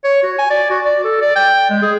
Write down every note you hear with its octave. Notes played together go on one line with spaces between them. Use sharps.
C#5
F#4
G#5
D5
F#4
D5
A4
D5
G5
G#3
G#4